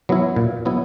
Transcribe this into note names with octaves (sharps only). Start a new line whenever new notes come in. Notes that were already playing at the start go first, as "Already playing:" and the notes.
F#3 B3 E4
A#2
F#3 B3 E4